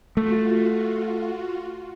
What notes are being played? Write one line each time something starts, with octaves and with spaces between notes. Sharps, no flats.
A3 F4 F#4